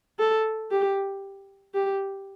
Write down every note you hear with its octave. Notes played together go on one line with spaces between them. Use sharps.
A4
G4
G4